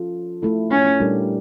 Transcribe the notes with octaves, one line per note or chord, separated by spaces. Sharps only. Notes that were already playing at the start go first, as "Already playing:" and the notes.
Already playing: F3 C#4 F4 A4
A3 E4 A4
C#4
A#2 G3 D4 G4 A#4